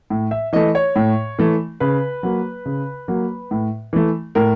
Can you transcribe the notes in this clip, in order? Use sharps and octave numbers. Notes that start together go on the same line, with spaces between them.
A2
E5
E3 A3 D#5
C#5
A2
E3 A3
C#3 B4
F#3 A#3
C#3
F#3 A#3
A2
E3 A3
A2 A#4